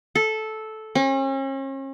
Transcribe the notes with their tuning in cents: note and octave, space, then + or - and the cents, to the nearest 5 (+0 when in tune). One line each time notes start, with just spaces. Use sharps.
A4 -10
C#4 -40